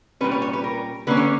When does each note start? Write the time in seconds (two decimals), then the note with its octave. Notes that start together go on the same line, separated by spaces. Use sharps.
0.21 A#2 G3 C#4 B4
0.32 C#5
0.42 C#5
0.53 B4
0.64 A#4
1.07 D3 A#3 C#4 B4
1.17 C#5